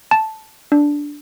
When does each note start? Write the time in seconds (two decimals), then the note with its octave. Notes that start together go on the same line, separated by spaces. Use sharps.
0.11 A5
0.72 D4